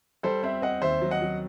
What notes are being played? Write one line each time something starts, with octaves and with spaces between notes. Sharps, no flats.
G3 A4 C5
C4 C5 E5
C4 D#5 F#5
D#2 C5 E5
F#3
D#5 F#5
F#3